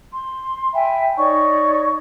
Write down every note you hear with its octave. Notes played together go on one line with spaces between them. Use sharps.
C6
E5 G5 G#5 B5
D#4 C#5 D5 C#6